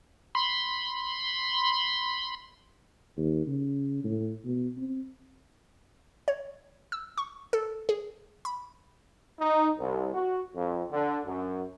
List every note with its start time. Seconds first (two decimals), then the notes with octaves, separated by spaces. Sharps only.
0.35 B5 C6
3.17 D#2
3.47 C#3
4.04 A2
4.45 B2
4.78 C4
6.28 C#5
6.92 E6
7.18 C#6
7.53 A4
7.89 G#4
8.45 B5
9.40 D#4
9.78 C2
10.14 F#4
10.54 F2
10.92 D3
11.25 F#2